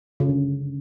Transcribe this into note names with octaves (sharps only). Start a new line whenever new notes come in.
C#3
D3